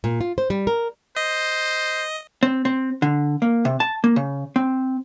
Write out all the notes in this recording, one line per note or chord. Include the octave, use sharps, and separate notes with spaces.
A#2
F4
C5
G3
A#4
C5 D#5
C4
C4
D3
A#3
C3
A5
A#3
C#3
C4